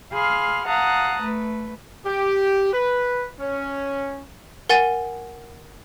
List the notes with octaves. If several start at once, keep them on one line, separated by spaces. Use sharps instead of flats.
G#4 F5 B5 C6 F6
F5 F#5 A5 A#5 D#6 F#6
A3 B4
G4
B4
C#4
A#4 F#5 G#5 A6 D#7 G7